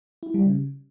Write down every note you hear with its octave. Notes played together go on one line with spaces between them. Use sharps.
E4
G3
C#3